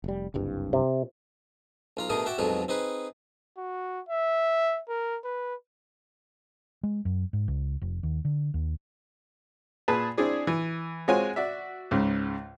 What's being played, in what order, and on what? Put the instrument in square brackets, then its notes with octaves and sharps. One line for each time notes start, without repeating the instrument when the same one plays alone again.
[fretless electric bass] F1 G3
F#1 C2 G2
[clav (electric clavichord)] C3
[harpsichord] B1 F4 A#5
B2 D3 A3 G#4 A#4 D#6
F#4 E5 G5 A5 D6
B1 F2 B2 F#3 G#3 A4
C4 D#4 G#4 B4
[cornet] F#4
E5
A#4
B4
[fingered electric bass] G#3
F#2
G#2
C#2
F1
D#2
D3
D#2
[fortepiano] A#2 G#4 B4 A5
C4 D4 E4 G#4 D5
E3
G#3 C4 F4 F#4 C#5 G#5
F#4 D5 E5
C#2 G#2 C#3